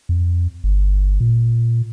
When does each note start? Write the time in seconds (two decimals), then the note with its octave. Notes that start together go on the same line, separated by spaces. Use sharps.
0.09 F2
0.64 G1
1.20 A#2